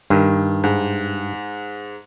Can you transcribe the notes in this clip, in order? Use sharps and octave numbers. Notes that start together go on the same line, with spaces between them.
G2 D#3
G#2